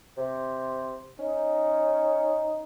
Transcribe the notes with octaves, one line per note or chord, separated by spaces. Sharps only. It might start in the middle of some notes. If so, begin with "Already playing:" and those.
C3 C5
C#4 D#4